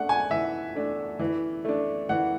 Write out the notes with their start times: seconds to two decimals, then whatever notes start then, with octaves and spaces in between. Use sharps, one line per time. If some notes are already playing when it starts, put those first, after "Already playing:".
Already playing: A3 D4 F#5
0.09 G#5
0.31 E3 E5
0.75 A3 D4
1.19 E3
1.65 A3 D4
2.09 E3 F#5